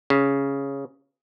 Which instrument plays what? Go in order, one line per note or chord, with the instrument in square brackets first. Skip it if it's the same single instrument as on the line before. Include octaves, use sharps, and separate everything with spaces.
[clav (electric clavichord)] C#3